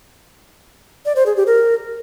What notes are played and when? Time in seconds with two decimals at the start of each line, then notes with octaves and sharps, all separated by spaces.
1.06 D5
1.16 C5
1.26 G#4
1.36 G4
1.47 A#4